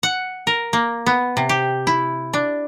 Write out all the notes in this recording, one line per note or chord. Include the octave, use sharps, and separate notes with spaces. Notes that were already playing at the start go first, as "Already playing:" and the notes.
F#5
A#4
A#3
B3
C3
G4
E4
D4